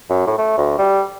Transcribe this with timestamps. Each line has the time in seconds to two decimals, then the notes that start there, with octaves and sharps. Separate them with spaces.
0.10 F#2
0.27 A2
0.38 A3
0.58 D2
0.79 G3